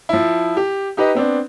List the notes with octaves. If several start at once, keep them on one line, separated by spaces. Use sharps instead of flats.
F3 E4
G4
D#4 G4 B4 D#5
B3 C4 D4